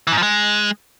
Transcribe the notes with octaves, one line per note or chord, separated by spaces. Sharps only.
E3
G#2
F3
G#3